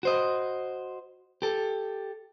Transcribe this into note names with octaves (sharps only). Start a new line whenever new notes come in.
F#4 C5 D#5
G4 A4